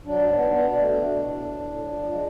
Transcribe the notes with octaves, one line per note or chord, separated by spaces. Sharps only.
F#3 D4
G#2
B3
B3
B2 D4
A3
B2
B2
A2
A2
A2
A2
F3
F3
G#3